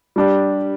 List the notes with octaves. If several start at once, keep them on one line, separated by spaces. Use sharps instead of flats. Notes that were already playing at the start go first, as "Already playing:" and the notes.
G3 D4 G4